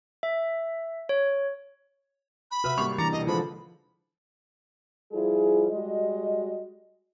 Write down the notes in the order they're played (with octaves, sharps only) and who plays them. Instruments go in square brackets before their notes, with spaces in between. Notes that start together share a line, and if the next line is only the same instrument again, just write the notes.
[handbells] E5
C#5
[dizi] B5
[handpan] C3 F#4 [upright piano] B4 E5 [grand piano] F6
[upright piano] G#1 C#6 F7 [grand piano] G3 A#3
[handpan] E3 D4 [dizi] A#5 [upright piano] D6 A6 C#7
[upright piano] E1 [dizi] D#5
[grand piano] D3 F3 [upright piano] G#3 [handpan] F4 C5 [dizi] B5
[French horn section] F3 G3 E4 F4 G#4
G3 G#3 F#4 D#5